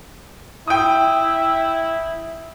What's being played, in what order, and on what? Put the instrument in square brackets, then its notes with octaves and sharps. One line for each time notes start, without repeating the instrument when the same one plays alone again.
[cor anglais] E4 [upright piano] G5 D#6